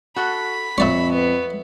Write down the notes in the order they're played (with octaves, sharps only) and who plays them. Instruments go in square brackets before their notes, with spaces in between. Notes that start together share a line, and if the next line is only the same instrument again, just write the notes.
[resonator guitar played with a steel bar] F#4 A4 F#5 [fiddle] B5
[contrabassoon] F2 [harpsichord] A#2 D5 C#6 [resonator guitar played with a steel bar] C#5 E5
[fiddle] B3